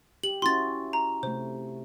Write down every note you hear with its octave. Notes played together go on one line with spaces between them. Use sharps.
G4 F#7
C#4 E4 F#4 C6 A6
A#5
C3 A3 C5